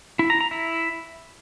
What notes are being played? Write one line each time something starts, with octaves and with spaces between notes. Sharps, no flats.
E4
A#5
A#5
E4